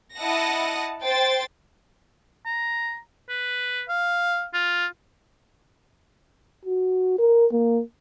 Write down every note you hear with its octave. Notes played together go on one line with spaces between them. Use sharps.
E4 D#5 F#5 A5 D#6 A#6
C5 G5 A6
A#5
B4
F5
F4
F#4
A#4
A#3